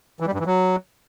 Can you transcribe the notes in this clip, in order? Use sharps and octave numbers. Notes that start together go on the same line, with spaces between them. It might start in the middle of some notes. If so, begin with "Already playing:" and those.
E3
G3
G2
E3
F#3